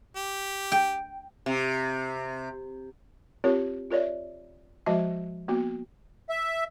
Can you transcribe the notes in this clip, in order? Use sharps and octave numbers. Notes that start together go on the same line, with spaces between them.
G4
G5
C3
C4 F4 G4 A#4 C#5
F4 A#4 C#5 D5 E5
F3 G#3 F#4 D#5 E5 A5
A#3 B3 F#4
E5